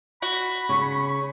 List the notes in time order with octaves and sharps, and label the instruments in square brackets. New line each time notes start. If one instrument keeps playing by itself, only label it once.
[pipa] F#4 [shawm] B5
[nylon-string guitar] C#3 [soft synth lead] C#6